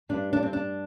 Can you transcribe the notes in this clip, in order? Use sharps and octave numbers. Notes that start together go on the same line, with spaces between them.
G2 G3 D4
D4
C4
D4